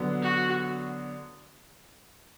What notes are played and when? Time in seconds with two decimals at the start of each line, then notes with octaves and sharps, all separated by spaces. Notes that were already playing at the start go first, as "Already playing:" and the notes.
Already playing: D3 F#3 B3
0.22 F#4